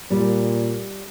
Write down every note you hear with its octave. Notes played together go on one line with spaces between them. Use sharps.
A#2 G3